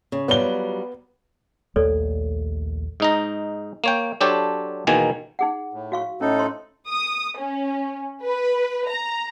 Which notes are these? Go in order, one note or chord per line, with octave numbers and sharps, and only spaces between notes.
C#3
F#3 G3 B3 F4 G7
A#1 D#2 A3 A4 C#5 D5
G#2 D#4 A#5
A#3 C#5 G5
F#3 D4 G4 A4 C5 C#5
E2 B2 D#3 A#3 G#5
D#4 G#4 F#5
A2
F#4 F5 C#6
A2 C#4 D#4 A4
C5 C6
D#6
C#4
B4
A#5